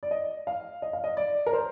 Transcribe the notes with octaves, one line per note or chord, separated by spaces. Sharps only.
D5
D#5
F5
D#5
F5
D#5
D5
A#4
C5